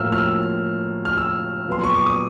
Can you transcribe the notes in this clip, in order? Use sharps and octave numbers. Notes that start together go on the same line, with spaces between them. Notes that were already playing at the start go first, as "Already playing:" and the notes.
Already playing: A2 F3 A#3 E6 F6
F6
E6
F6
E6
A#2 F#3 B3 C6
C#6
D6
D#6